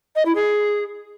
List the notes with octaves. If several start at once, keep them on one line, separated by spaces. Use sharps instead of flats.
D#5
E4
G#4